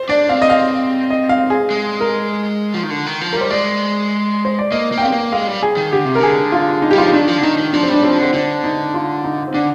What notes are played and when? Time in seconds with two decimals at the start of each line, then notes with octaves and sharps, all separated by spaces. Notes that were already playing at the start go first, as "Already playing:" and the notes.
Already playing: C5
0.09 D4 D5
0.29 C4 F5
0.42 D#5
0.50 F5
1.10 D#5
1.29 F5
1.50 G#4
1.70 G#3
2.01 A#4
2.74 F3
2.83 D#3
2.90 D3
3.06 D#3
3.21 F3
3.33 G3 A#4
3.41 C5
3.50 G#3 D5
4.45 C5
4.59 D5
4.72 A#3 D#5
4.92 A#3
4.98 G5
5.02 C4 F5
5.12 A#3
5.32 G#3 F5
5.47 G3
5.63 G#4
5.77 D#3
5.91 D3 G4
6.05 C3
6.15 A#4
6.19 D3 G#4
6.52 F4
6.82 D#4
6.91 G3 G4
6.98 F4
7.02 F3 D#4
7.13 D#3 D4
7.28 F3
7.38 D3
7.43 D#3 D#4
7.58 D#3
7.73 F3 D4
7.83 G3 C4
7.93 D4
8.03 F3 C4
8.18 D3 C4
8.34 D3 D4
8.64 D#4
8.94 F4
9.24 D#4
9.48 C4
9.54 D3 D4